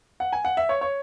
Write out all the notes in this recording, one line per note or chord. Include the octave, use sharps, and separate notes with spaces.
F#5
G#5
F#5
E5
C#5
C#5